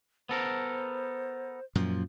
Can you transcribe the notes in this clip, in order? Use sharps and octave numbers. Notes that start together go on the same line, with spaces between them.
B3 A4 A#4 C5
F#2 A#2 F3